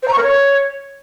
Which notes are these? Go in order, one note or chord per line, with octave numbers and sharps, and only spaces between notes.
C5
A#5
C#6
A#4
C#5